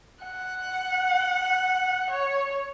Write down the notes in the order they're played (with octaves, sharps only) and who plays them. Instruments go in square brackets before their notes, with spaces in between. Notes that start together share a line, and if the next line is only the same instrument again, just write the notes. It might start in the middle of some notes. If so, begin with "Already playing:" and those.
[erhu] F#5
C#5